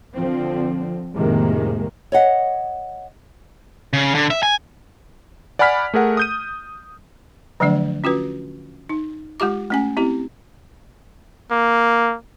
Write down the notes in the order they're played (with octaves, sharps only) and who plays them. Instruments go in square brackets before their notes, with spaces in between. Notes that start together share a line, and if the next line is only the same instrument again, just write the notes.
[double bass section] D3 F3 C4
F2 A2 C3 D#3 G#3 A#3
[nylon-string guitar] C#5 D#5 F#5
[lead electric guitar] C#3
D3
E5
G#5
[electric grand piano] D5 F#5 G#5 B5 F6 B6
A3 G#4 A#4 F#5
D#6 G6 D#7
[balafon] D3 F3 F#3 A3 D4 D5
C#4 F4 F#4 B4
D#4
G#3 F4 G4 D6
A3 C#4 G#5
C4 E4 G4
[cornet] A#3